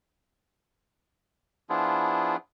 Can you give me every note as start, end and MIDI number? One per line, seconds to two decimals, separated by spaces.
1.70 2.36 53
1.70 2.36 59
1.70 2.36 62
1.70 2.36 64
1.70 2.36 65
1.70 2.36 68